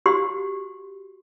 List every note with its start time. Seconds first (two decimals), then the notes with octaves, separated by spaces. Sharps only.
0.06 F#4 G4 C6